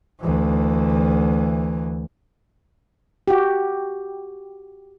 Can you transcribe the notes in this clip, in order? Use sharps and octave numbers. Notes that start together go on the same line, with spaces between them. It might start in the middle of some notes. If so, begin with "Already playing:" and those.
D2 E3
F#4 G4